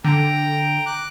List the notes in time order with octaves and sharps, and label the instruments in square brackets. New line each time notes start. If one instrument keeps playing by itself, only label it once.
[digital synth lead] D3 [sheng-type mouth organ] G5 A#5
[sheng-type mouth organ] D6 F#6